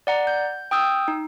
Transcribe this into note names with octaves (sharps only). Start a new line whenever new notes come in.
D5 F#5 A#5
G6
G5 D#6 E6 G6
D#4